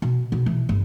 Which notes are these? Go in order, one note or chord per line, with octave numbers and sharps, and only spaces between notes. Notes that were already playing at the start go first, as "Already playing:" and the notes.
B2
B2
E3
G1